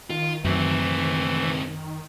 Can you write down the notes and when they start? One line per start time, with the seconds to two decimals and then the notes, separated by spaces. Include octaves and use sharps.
0.10 D#3 F4
0.44 C#2 F#2 E3 A3 C4